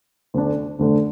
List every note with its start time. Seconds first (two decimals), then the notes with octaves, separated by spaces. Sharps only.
0.34 D2 D3 A3 D4
0.79 D2 D3 A3 D4